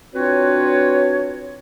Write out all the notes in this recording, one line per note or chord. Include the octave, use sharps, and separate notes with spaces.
C4 D4 F4 F#4 B4 C#5